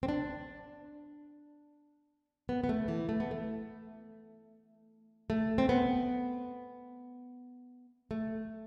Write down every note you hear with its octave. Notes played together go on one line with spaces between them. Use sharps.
C4
D4
B3
B3
A3
E3
A3
B3
A3
A3
C4
B3
A3